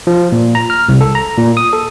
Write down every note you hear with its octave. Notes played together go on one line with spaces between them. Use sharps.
F3
A#2
A#5
F6
C2
A4
A#5
A#2
D#6
A4